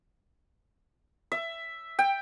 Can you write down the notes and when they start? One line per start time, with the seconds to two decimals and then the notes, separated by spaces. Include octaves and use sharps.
1.32 E5
1.99 G5